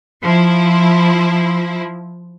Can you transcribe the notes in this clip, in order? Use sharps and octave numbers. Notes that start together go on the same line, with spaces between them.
F3 E4